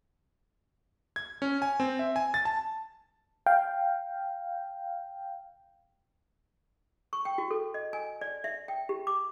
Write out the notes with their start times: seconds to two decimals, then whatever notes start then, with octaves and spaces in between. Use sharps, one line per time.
1.16 G#6
1.42 C#4
1.62 G#5
1.80 C4
1.99 E5
2.16 G#5
2.34 A6
2.45 A5
3.46 F5 G5
7.13 C#6
7.25 G5
7.38 F#4
7.51 A4
7.74 D#5
7.93 G#5
8.21 D5
8.44 E5
8.68 G5
8.89 G4
9.07 D6